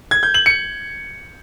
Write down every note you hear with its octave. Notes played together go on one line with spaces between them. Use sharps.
G#6
G6
F#7
C#7